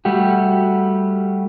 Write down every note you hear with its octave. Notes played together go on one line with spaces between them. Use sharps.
G3 A3 F#4 G4